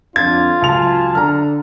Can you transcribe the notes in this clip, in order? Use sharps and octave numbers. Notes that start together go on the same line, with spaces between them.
F2 D3 D4 F4 G#6 A6
C#2 F#3 G#5 A5 F7
D3 A#5 F6